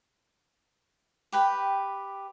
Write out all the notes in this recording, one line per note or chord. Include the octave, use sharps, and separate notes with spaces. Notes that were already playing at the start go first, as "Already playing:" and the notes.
G4 B4 G5